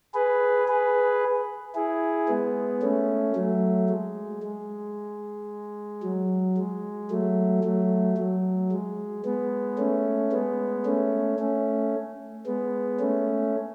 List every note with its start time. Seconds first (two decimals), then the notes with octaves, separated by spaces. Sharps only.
0.14 G#4 B4
0.68 G#4 B4
1.75 E4 G#4
2.28 G#3 B3
2.82 A3 C#4
3.36 F#3 A3
3.89 G#3
4.43 G#3
6.03 F#3
6.57 G#3
7.11 F#3 A3
7.64 F#3 A3
8.18 F#3
8.72 G#3
9.25 G#3 B3
9.78 A3 C#4
10.32 G#3 B3
10.86 A3 C#4
11.39 A3 C#4
12.46 G#3 B3
13.00 A3 C#4